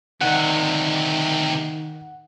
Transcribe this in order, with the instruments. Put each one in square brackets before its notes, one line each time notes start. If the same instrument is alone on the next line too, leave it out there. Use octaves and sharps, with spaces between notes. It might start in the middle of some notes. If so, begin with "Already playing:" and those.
[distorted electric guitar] D2 C3 [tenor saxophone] D#3 [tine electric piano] F#5